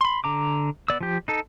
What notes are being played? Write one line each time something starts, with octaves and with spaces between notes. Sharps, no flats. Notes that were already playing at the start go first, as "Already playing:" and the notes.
B5 C6
D3 A#5 D6
B3 D5 E6
F3 G4
D#4 A4